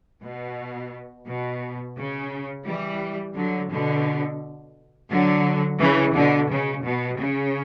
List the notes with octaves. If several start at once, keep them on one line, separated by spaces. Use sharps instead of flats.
B2
B2
C#3
E3 G3
D3 F#3
B2 D3
D3 F#3
C#3 E3
B2 D3
C#3
B2
C#3